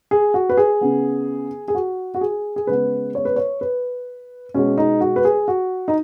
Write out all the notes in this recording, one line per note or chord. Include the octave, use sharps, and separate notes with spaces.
G#4
F#4
B4
G#4
C#3 B3
G#4
F#4
F#4
G#4
G#4
C#3 G#3 B3 B4
C#5
B4
C#5
B4
B2 G#3 B3 C#4
D#4
F#4
B4
G#4
F#4
D#4